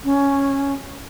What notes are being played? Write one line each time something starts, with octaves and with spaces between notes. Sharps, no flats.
C#4